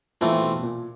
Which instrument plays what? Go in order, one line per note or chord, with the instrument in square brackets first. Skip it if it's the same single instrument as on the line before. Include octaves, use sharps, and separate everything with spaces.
[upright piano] A#2 [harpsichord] E3 A3 C4 F4
[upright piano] A#2
B2
A#2